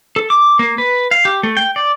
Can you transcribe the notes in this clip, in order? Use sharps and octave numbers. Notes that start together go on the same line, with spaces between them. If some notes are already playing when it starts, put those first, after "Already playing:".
A4
D6
A#3
B4
F5
G4
A3
G5
D5